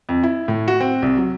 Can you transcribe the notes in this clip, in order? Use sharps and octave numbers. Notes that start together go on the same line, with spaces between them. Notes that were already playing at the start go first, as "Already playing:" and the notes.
F2
E4
A2
F#4
C4
C2
F#3